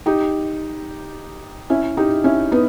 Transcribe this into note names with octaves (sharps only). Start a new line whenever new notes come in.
D#4 G4
C#4 E4
D#4 G4
C#4 E4
B3 D#4